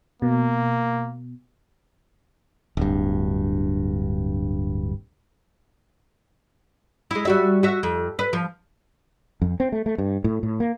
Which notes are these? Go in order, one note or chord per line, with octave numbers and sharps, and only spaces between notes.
B2 A#3
D1 G2
G#3 E4
G3 F#4 E5
F#4 E5
F2
B4
F3
F2
C4
A3
A3
G2
A2
A2
A#3